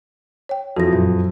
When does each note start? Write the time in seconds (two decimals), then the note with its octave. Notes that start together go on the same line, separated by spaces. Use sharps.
0.49 C#5 G5
0.77 F2 E3 F3 F#4 A#6
0.91 F#2 A#2 F#3